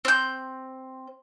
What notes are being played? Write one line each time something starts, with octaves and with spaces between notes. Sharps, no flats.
C4 G6